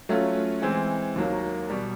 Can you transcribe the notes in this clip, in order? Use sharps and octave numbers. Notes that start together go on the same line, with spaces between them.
F#3 A3 C#4 F4
E3 G#3 C4 E4
D#2 D#3 F#3 A#3
B2 G3